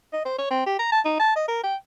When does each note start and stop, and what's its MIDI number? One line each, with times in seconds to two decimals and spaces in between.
0.13 0.24 75
0.25 0.37 72
0.38 0.46 73
0.50 0.65 60
0.66 0.77 67
0.79 0.89 82
0.92 1.00 81
1.05 1.15 63
1.20 1.35 81
1.36 1.45 75
1.48 1.61 70
1.64 1.76 79